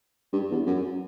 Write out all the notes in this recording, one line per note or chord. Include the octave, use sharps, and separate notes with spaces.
G2
E2
F#2